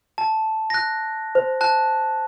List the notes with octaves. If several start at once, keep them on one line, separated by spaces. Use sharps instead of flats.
A5
F#6 A#6
C5
A5 F#6